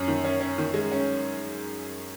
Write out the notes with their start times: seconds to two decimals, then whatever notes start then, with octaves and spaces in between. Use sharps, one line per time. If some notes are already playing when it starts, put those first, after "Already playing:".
Already playing: F#2 C#4
0.08 D#3
0.24 C#4
0.41 C#4
0.58 D#3
0.74 G#3
0.92 C#4